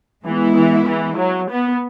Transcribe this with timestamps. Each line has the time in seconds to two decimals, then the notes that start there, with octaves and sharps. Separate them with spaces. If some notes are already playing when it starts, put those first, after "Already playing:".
0.25 E3 G#3 B3 E4
0.56 E3
0.86 E3
1.18 F#3
1.49 B3